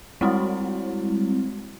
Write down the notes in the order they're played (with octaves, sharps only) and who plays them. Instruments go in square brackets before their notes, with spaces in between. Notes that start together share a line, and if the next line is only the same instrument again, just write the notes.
[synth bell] G3 G#3 C4 E4 F#4